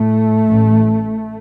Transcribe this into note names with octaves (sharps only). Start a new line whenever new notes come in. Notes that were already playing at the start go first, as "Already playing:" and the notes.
Already playing: A2 A3
A1 A2